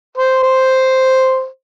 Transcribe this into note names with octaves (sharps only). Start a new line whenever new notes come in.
C5
C5